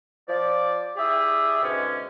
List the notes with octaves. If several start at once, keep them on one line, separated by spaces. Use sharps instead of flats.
F3 D5
E4 G4 G#4 D5 E5
G#2 B2 D3 C#4